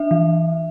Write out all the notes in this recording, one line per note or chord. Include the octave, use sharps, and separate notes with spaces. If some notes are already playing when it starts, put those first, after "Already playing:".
Already playing: D4 E5
E3